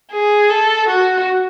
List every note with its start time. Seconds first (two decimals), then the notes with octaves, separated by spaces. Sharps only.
0.12 G#4
0.50 A4
0.89 F#4